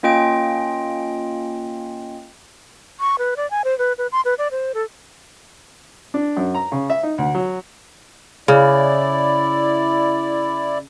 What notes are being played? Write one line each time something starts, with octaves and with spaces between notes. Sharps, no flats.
A#3 C#4 F4 D#5 G5 D7
C#6
B4
D5
G#5
C5
B4
B4
C6
B4
D5
C5
A4
D4
F#2
A#5
C#3
E5
D#4
D2
F#3
C#3 E4 D5